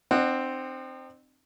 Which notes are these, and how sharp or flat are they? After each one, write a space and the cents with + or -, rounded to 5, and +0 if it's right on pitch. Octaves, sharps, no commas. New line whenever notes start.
C4 +0 D#4 -45 F#5 +0